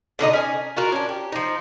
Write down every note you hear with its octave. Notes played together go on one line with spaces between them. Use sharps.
B2 D3 D#4 D#5
C#4 G#5
F4 F#4 A#4
C#4 D4
G4
F3 D#4